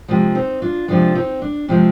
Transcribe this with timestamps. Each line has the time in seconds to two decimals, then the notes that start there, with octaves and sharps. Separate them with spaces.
0.08 C3 F3 G#3
0.35 C4 D#4
0.62 D4 F4
0.88 C3 F3 G#3 D4 F4
1.15 C4 D#4
1.42 D4
1.68 C3 F3 G#3 C4